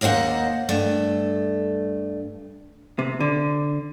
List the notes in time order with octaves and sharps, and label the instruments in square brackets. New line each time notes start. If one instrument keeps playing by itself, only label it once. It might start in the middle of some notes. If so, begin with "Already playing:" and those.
[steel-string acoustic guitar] D#2 A#3 C5 D#5 F#5
G2 A3
[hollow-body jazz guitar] C3
D3